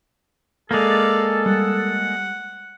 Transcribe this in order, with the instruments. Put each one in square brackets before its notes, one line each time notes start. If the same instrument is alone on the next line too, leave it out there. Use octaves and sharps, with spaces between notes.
[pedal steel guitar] G#3 A#3 [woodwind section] A4 [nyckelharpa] D5 F5
[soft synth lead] G3 [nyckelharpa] F#5